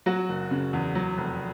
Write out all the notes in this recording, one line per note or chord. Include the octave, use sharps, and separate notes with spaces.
F#3 F#4
F#1
C#3
E2
F#3
F1